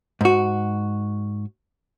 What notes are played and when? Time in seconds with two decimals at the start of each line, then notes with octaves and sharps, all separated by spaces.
0.21 G#2 F#4